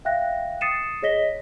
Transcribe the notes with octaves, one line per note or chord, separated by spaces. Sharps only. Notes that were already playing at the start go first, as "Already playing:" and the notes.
E5 F5 G5 F#6 A#6
D#6 A6 C7 C#7 D#7 E7
G#4 C#5 D#5 A#6 B6 G7